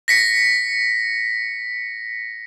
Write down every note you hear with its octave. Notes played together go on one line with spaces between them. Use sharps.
A#6 B6 C#7